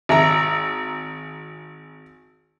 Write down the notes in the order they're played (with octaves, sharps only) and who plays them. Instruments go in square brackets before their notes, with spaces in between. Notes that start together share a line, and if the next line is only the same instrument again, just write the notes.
[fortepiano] G#1 E5 A#5